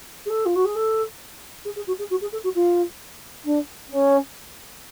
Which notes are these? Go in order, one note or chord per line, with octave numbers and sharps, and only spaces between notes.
G#4
A4
F4
F#4
G#4
A4
G#4
G#4
F#4
G#4
F#4
G#4
A4
F#4
F4
D4
C#4